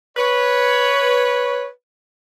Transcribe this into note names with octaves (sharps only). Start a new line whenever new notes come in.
B4 C#5